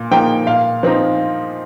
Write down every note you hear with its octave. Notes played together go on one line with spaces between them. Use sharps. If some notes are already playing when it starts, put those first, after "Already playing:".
Already playing: A#2
F3 A#3 D#4 G5
A#2 F5
F3 C4 D#4